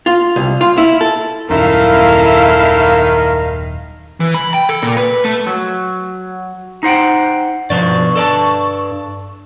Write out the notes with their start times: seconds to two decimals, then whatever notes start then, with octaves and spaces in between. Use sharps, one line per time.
0.06 F4
0.36 C2
0.61 F4
0.78 E4
1.01 A4
1.50 D#1 F#2 D#3 E4 A4 F5
4.20 E3
4.34 B5
4.54 G5
4.69 A4
4.83 A#2
4.97 B4
5.25 A3
5.47 F#3
6.83 D#4 C5 F#5 G5
7.70 G2 B2 F3 D5 C#6
8.16 A4 D5 A5